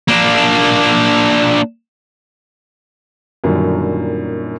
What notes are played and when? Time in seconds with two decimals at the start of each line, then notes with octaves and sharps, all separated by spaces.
0.09 A#3 D4
3.44 F#2 A#2 D3 D#3 F#3 G3